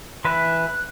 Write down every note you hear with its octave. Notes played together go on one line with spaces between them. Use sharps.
E3 B4 E5 F#6